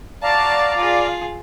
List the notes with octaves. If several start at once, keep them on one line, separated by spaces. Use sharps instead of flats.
F#4 D5 F5 A5 A#5
F4 G#4